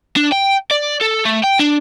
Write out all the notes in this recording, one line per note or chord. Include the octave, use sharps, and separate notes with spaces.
D4
G5
D5
A4
A3
G5
D4